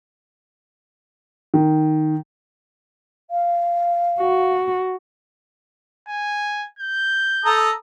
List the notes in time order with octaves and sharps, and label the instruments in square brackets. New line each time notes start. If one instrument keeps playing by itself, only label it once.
[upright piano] D#3
[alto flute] F5
[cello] F#4
[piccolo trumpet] G#5
G6
[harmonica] A4 A#5 D#6